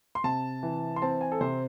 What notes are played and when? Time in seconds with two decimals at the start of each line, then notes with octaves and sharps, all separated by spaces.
0.15 C6
0.24 C3 A5
0.63 E3
0.96 C6
1.02 C4 A5
1.21 G#5
1.32 A4
1.41 C3 C5